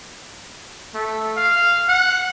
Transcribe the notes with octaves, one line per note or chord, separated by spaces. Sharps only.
A3
F5
F#5